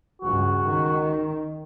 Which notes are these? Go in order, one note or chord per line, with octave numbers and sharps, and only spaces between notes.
C#2 G2 F#4
D#3